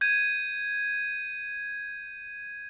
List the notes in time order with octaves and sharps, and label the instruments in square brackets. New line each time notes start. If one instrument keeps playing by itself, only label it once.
[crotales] G6 G#6 D#7